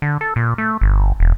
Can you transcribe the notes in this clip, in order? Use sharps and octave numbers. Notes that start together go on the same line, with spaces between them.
D3
A4
A#2
A3
G1
E1